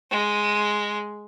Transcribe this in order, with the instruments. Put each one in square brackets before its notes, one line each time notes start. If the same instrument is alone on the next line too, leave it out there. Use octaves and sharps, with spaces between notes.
[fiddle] G#3